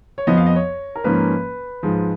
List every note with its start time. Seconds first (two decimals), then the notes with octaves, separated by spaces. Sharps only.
0.18 C#5
0.27 F2 F3 B3 D#5
0.37 F5
0.46 D#5
0.56 C#5
0.96 A#4
1.04 G#2 F3 A#3 C#4 B4
1.83 G#2 F3 G#3